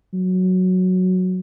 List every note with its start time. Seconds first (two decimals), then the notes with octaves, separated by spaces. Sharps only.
0.13 F#3